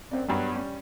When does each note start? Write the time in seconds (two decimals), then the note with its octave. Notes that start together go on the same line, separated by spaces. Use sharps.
0.11 F#2 C4 D5
0.28 G2 F#3 G3 B3
0.52 G3 C#4